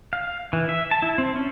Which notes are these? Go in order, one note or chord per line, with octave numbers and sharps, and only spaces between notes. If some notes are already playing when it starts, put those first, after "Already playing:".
F5
E3
E5
A5
E4
C4
C#4